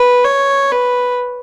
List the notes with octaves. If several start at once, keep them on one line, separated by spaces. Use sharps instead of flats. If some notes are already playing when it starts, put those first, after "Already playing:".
Already playing: B4
C#5
B4